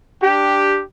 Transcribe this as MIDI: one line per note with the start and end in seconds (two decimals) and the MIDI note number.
0.23 0.82 62
0.23 0.82 67